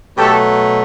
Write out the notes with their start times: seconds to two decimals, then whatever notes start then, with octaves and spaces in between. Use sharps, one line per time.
0.17 B2 F#3 A3 G4 A4